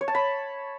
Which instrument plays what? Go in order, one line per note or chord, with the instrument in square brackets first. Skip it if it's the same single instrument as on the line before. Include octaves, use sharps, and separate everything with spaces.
[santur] C#5
A5
B5